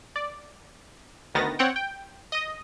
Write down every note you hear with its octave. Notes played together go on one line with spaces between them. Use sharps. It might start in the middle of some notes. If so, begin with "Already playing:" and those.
D5
D2 D#3 B3 A6 A#6
C4 C#5 F#5 G5
G5
D#5 D#6